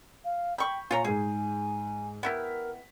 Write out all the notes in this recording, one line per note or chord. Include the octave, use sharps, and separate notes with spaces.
F5
G5 B5 C#6 G6
A#2 F4 C#5 G#5 A#5
G#2 G#3 G#4
B3 E4 G4 A#4 F#5 B6